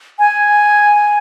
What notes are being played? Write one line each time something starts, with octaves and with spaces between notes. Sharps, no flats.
G#5